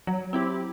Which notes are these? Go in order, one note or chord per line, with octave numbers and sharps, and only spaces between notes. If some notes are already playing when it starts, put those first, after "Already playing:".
F#3
C4 E4 G4